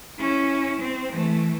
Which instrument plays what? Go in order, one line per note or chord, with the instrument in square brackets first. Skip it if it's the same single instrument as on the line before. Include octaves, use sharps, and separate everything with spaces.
[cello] C#4 E4
C4
E3 A3